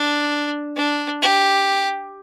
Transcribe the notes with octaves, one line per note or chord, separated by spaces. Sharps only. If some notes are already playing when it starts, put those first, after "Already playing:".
Already playing: D4
D4
G4